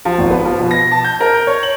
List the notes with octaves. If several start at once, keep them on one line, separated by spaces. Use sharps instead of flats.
F3
G#1
B3
F3
B2
A#6
A5
G6
A#4
G6
C#5
F#7